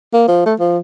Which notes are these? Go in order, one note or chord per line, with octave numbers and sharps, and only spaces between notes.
A#3
F3
A3
F3